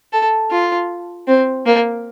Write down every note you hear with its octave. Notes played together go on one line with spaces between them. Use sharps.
A4
F4
C4
A#3